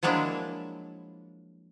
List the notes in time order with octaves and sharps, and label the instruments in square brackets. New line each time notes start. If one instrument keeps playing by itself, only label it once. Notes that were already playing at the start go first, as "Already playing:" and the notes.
[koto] F3 F#3 G#3 A#3 D4 E4